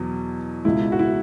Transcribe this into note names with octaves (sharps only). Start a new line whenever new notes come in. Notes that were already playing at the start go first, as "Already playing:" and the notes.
Already playing: E2 B2 F#3
C#2 B2 G#3 E4
F#4
E4